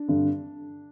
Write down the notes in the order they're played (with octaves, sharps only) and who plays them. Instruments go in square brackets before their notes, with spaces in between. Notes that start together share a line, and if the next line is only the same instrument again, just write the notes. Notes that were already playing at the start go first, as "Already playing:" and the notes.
Already playing: [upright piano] D4
G2 D3